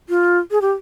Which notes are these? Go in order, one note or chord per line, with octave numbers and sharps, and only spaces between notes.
F4
G#4
G4